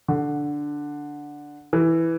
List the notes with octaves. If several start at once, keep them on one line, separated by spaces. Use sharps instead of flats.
D3
E3